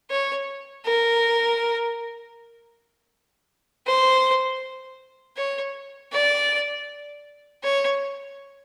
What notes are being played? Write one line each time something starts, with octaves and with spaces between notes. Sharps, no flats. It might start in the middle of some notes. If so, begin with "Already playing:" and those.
C#5
A#4
C5
C#5
D5
C#5